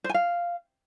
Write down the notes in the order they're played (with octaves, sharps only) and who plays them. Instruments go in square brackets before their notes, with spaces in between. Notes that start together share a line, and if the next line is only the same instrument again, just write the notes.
[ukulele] C5
G#5
F5